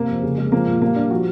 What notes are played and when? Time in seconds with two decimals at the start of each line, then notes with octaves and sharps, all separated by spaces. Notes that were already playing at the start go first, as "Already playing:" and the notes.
Already playing: C3 A#3
0.09 F2
0.23 C#3
0.38 G#3
0.52 F3 A#3
0.67 A#2
0.81 G3 A#3
0.96 G3 D4
1.10 F3 F#4